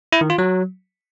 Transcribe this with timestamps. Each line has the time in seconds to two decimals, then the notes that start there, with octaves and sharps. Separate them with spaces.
0.12 E4
0.21 D#3
0.30 F4
0.38 F#3